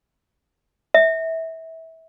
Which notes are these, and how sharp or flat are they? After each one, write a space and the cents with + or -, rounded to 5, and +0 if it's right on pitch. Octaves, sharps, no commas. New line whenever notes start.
E5 -25